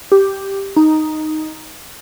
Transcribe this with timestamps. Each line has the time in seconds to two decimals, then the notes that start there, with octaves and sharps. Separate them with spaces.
0.12 G4
0.76 D#4